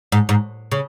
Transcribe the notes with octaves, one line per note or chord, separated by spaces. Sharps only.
G#2
G#2
C#3